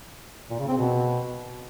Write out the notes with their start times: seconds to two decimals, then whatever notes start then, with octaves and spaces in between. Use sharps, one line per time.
0.50 A#2
0.59 C#3
0.69 C4
0.78 B2